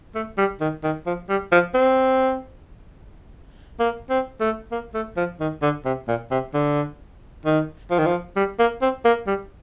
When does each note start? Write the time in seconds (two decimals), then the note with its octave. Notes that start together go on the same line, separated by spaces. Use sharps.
0.15 A3
0.38 G3
0.60 D#3
0.83 D#3
1.06 F3
1.29 G3
1.52 F3
1.74 C4
3.79 A#3
4.10 C4
4.40 A3
4.71 A#3
4.94 A3
5.17 F3
5.40 D#3
5.62 D3
5.85 C3
6.08 A#2
6.31 C3
6.54 D3
7.45 D#3
7.91 F3
7.98 D#3
8.06 F3
8.36 G3
8.59 A#3
8.82 C4
9.05 A#3
9.27 G3